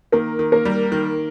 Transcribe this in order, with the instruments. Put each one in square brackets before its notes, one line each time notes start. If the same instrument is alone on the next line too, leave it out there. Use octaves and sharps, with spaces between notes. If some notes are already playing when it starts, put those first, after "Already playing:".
[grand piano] D#3 [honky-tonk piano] A#3 A#4
[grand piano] D#3
[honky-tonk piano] A#3 A#4
[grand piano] G3
D#3